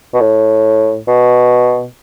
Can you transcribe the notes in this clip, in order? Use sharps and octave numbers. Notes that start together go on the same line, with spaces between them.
B2
A2
B2